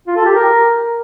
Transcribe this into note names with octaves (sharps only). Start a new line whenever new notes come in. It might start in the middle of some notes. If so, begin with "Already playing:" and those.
F4
A4
G4
A#4